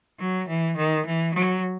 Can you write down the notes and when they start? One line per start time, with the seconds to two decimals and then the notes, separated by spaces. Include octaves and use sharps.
0.20 F#3
0.48 E3
0.77 D#3
1.06 E3
1.34 F#3